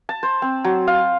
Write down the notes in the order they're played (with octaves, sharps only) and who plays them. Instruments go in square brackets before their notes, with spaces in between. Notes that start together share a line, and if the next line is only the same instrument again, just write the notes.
[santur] A5
C5
C4
F#3
F5